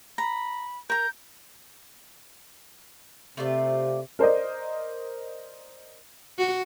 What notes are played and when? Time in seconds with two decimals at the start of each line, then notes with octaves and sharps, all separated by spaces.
0.18 A#5 B5
0.90 A#4 A#5 G6
3.37 C3 A3 F4 D5
4.19 A#4 C5 D5 D#5
6.39 F#4